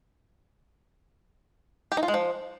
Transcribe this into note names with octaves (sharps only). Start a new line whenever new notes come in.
G4
D#4
F4
G#3
F3